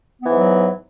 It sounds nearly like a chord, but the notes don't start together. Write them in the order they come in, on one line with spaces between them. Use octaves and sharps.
B3 E3 G#2 F#3